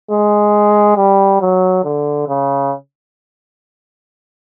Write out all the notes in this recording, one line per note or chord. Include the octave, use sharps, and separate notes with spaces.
G#3
G3
F#3
D3
C#3